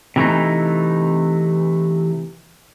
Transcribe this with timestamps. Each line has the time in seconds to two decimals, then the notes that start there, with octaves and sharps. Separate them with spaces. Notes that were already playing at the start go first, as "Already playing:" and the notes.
0.16 C3 E3 A3 D#4